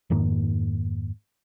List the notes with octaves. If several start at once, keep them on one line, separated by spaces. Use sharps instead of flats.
F2 G#2 D#3 A#3